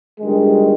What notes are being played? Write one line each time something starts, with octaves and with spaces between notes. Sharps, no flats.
G1 G2 D#3 G#3